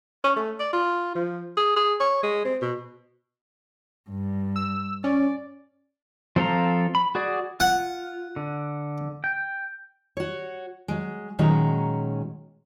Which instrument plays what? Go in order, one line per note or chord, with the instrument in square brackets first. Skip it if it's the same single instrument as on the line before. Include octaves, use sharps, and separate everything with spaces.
[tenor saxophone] C#4
A3
D5
F4
F3
G#4
G#4
C#5
G#3
C4
B2
[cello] G2
[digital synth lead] E6
[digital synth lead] C#4 [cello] D5
[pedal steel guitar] F3 C4 A4 F5 A#5
B5
F#4 G#4 D5
[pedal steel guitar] F4 [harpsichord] F#5
[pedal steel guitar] D3
G5
[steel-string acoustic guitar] F#4 C#5
F#3 G#3
A#2 D#3 F#3 G#3 C#4 A#5